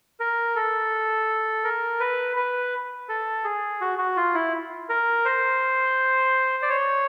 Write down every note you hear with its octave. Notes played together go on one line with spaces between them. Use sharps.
A#4
A4
A#4
B4
B4
A4
G#4
F#4
F#4
F4
E4
A#4
C5
D5
C#5